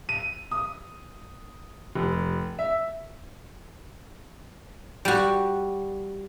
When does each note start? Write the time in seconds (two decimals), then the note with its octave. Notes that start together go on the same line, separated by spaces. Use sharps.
0.09 D#7
0.51 D#6
1.95 F1
2.59 E5
5.05 G3 F#4